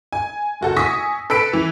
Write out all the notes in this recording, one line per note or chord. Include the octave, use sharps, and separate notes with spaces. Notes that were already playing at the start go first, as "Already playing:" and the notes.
G#5
F#1 F#4 A4
G#5 C#6 D#6 E6 A#6 B6
A4 B4 E6 B6 D7
E3